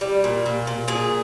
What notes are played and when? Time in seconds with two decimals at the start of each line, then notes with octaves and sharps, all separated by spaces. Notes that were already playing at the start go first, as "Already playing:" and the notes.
0.01 G3
0.24 A#2
0.46 A#2
0.67 A#2
0.88 A#2 G#4